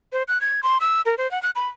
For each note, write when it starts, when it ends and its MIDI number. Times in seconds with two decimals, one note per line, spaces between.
0.13 0.23 72
0.28 0.41 90
0.41 0.61 92
0.63 0.78 84
0.81 1.01 88
1.06 1.15 70
1.18 1.29 72
1.31 1.41 78
1.43 1.50 90
1.56 1.67 83